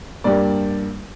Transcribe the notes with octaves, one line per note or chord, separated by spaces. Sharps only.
G2 G3 A#3 D5